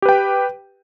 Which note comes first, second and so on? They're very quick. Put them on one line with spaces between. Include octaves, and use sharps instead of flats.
G4 B4 G5